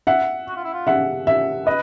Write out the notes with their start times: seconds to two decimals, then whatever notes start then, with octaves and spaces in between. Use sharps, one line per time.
0.07 E5 F#5
0.48 F#4
0.56 F4
0.64 E4
0.73 F4
0.87 E5 F#5
1.27 E5
1.66 B4 D#5